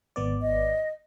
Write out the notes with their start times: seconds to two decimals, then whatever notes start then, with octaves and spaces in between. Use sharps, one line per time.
0.16 G#1 B3 D5
0.42 D#5